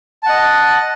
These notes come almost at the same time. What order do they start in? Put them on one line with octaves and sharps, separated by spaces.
A5 F#5 D#5